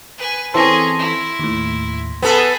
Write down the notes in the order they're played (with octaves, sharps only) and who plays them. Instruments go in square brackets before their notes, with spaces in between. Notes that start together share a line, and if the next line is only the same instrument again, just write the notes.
[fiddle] B4 G#5
[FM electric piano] E3 C4 A4 [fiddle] C#4 G#4 [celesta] C6 A#6
[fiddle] E4
[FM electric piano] D#2 A2
[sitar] B3 A4 [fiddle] G#4 B5